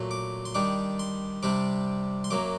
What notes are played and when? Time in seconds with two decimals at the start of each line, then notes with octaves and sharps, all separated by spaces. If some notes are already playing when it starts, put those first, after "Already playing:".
Already playing: A#2 F#3 A3
0.11 D6
0.45 C6
0.54 D#3 G3 D4 D6
0.99 C6
1.43 C3 G3 D4 D6
2.24 C6
2.30 F#2 F#3 A#3 D6